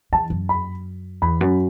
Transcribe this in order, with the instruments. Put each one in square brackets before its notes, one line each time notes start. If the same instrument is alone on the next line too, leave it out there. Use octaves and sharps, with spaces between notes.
[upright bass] E3 [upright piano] A5
[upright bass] F#2
[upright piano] B5
[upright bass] E2 [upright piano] B5
[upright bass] F#2